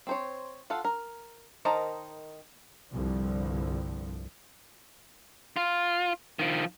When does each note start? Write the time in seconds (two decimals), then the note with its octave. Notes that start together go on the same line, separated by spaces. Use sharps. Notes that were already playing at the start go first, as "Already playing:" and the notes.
0.07 C4 C5 C#5
0.70 F4 A4 F5 F#5
0.85 A#4
1.65 D#3 A#4 C5 D#5 A5
2.89 C2 G2 D3 F3
5.56 F4
6.39 D#3 F3